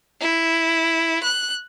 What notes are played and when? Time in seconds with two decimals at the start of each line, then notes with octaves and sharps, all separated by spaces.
0.21 E4
1.23 F#6